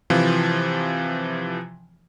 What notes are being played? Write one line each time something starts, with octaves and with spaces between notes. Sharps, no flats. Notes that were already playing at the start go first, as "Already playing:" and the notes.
C3 E3 F3 F4